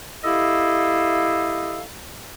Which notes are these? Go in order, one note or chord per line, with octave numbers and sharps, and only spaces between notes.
E4 G4 A4 D#5 F5